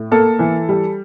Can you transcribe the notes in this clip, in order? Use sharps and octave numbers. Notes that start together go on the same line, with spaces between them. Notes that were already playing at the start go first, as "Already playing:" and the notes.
Already playing: A2
A#3 A4
E3
G3